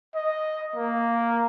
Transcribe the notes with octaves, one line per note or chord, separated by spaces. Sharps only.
D#5
A#3